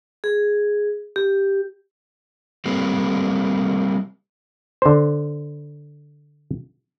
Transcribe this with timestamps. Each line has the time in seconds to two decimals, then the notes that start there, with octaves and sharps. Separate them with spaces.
0.24 G#4
1.16 G4
2.65 G3 A3 A#3 C4
4.82 D3 C5